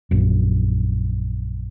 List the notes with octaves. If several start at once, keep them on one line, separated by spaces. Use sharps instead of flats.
A#1 F#2